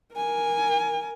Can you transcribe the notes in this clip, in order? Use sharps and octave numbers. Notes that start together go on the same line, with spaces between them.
A#4 G#5